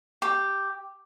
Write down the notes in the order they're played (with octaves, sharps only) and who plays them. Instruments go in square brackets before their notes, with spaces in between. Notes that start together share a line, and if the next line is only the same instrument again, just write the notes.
[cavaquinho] G4